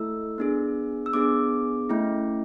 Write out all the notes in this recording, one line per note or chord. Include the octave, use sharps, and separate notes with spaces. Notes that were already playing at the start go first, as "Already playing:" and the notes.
Already playing: A3 E4 A4 E6
B3 D4 G#4
E6
B3 D4 G#4 D6
A3 C#4 E4